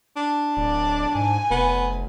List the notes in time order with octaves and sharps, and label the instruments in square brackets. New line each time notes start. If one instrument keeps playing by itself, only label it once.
[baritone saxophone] D4
[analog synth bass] D1 [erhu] D5
[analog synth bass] G#2 [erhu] G#5
[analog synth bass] F1 [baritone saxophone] B3